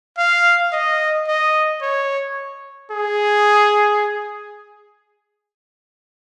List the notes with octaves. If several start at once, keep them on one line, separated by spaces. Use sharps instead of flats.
F5
D#5
D#5
C#5
G#4